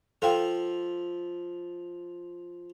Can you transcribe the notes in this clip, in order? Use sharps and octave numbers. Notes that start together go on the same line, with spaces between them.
F3 F4 A4 E5 F5 G5